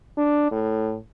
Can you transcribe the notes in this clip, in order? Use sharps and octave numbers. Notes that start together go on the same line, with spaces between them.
D4
A2